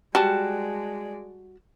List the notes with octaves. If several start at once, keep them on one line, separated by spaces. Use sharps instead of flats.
G3 G#3 F#4 D5 A5